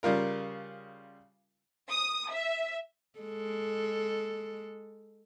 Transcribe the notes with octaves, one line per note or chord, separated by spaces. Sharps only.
C#3 G3 F4 A#4
D#6
E5
G#3 A4